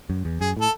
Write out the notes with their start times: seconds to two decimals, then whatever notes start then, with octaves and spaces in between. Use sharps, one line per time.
0.10 F#2
0.25 E2
0.41 F#2 G#4
0.57 A2
0.61 A4